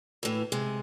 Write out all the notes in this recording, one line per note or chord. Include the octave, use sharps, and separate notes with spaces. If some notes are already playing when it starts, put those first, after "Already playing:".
A2 E3
C3 G#3